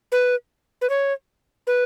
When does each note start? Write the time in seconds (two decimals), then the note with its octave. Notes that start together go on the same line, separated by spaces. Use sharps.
0.12 B4
0.82 B4
0.90 C#5
1.67 B4